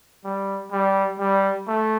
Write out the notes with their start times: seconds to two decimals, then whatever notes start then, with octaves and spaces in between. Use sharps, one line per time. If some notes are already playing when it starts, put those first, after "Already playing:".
0.24 G3
0.71 G3
1.19 G3
1.67 A3